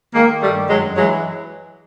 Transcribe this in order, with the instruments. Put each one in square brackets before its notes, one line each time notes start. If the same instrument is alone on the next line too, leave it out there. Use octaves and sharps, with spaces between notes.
[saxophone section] D#3 G#3 A#3
G2 G3 A3
F#2 F#3 G#3
E3 F#3 G#3